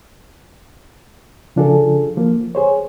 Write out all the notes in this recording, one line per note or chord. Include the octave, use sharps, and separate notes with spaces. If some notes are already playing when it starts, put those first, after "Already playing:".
C#3 F3 D4 F4 G#4 A4
F3 A#3
G#4 C5 C#5